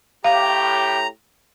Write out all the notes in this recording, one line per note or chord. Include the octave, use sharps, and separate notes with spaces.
A2 G4 F5 A#5